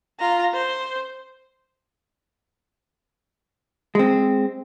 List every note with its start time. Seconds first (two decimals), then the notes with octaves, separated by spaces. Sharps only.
0.20 F4 A#5
0.54 C5
3.95 G#3 C4